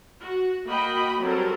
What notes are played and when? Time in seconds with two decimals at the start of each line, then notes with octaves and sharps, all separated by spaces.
0.21 F#4
0.66 A#3 F#4 D#5 G5 B5
1.20 F#3 G3 C4 A4 A#4